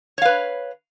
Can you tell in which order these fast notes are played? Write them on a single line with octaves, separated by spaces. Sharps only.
C#5 F5 B4